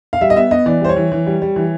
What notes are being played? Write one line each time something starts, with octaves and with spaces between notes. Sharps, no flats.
F5
G3 E5
D#5
B3 E5
B3 D#5
E3 D5
G3 C5
C#5
E3
E3
G3
G3
E3